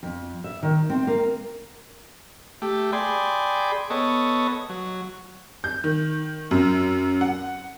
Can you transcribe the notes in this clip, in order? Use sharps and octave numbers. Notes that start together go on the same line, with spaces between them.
F2
E5
D#3
C4
A#3
A3 G4
G#4 D5 G5 B5 C6
B3 A4 C#5 D#5
F#3
G6
D#3
F#2
F#5